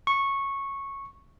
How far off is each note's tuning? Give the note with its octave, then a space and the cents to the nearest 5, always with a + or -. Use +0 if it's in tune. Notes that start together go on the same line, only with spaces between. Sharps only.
C#6 -10